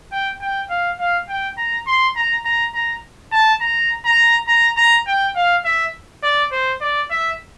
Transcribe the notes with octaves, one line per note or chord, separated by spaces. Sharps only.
G5
G5
F5
F5
G5
A#5
C6
A#5
A#5
A#5
A5
A#5
A#5
A#5
A#5
G5
F5
E5
D5
C5
D5
E5